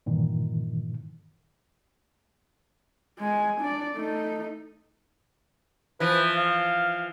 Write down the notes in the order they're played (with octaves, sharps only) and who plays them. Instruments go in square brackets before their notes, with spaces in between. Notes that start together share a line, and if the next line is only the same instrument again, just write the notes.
[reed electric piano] G2 A#2 D#3 E3
[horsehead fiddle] G#3 G#5
D4 D5
A3 D#4
[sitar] E3 F3 [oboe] B4
[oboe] F5